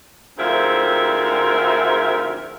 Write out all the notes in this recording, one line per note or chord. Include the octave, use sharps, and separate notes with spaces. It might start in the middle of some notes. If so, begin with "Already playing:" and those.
D2 G#2 F3 C4 A#4 E5